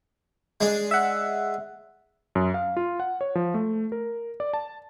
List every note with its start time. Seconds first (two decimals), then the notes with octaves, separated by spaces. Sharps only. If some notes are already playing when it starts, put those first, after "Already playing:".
0.61 G#3 D4
0.91 E5 F#5
2.35 F#2
2.54 F5
2.77 F4
3.00 F#5
3.21 C#5
3.35 F3
3.54 A3
3.92 A#4
4.40 D5
4.53 A5